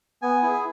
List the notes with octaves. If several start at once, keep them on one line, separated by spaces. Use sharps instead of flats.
B3 G#5
E4 G#4